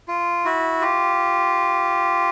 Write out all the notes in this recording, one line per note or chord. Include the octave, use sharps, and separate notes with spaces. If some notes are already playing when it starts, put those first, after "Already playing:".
F4
E4 F#4
F4 G4